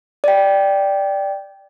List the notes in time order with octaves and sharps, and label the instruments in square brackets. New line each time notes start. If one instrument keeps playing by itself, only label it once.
[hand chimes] D5 G5